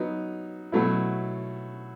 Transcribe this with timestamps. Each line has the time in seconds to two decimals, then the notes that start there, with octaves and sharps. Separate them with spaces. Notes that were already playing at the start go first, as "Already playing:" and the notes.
Already playing: F#3 B3 D#4
0.72 B2 F#3 A3 E4